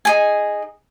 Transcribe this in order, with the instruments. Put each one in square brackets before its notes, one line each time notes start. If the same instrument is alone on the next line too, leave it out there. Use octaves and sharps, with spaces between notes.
[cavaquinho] D#4 G#4 G#5